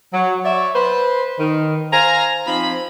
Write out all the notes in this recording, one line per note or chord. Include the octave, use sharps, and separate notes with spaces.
F#3
C#5 D5 E5
B4 C5
D#3
C5 F5 G#5 A#5
F3 C4 D#4 B5